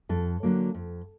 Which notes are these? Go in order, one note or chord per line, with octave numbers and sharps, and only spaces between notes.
F2 A4
D3 F#3 A#3
F2